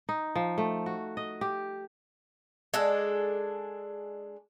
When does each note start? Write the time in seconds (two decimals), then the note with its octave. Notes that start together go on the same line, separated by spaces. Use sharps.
0.09 D#4
0.35 F3
0.58 A3
0.86 F#4
1.17 D#5
1.41 G4
2.74 G#3 D4 A4